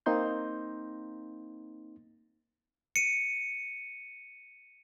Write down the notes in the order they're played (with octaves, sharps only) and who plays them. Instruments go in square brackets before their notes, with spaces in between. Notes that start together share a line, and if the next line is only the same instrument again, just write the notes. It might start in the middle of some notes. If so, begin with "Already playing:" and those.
[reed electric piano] A#3 C4 D#4 C6 G6
[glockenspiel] C#7 D#7